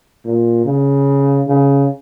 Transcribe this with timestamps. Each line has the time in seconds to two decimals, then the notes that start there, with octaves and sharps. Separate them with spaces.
0.25 A#2
0.65 C#3
1.47 C#3